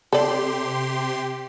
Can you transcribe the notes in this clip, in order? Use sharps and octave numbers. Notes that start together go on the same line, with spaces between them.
C3 G4 A4 D5 C6